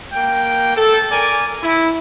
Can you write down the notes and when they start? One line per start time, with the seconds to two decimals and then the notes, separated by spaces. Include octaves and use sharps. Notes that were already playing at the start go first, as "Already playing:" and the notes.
0.12 A#3 G5
0.76 A4
1.11 A#4 D5 G#5
1.62 E4